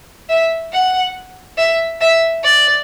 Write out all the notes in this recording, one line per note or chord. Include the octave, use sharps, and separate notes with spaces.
E5
F#5
E5
E5
D5